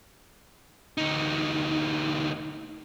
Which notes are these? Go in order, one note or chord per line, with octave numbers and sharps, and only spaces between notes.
D2 D#4